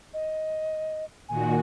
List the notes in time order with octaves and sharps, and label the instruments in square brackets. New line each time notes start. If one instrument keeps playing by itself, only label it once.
[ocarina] D#5
[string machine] A#2 D#3 F#4 [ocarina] G#5